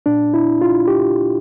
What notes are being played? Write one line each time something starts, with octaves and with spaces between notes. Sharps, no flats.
A#2 D4
E4
F4
G4